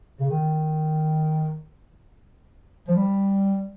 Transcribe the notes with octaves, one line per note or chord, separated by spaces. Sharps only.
C#3
D#3
F3
G3